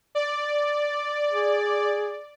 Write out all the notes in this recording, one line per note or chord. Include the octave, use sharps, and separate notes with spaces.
D5
G#4